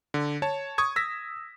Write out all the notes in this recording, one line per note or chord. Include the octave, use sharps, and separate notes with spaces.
D3
C#5 A5
C#6 D#6 G#6
E6 A#6 B6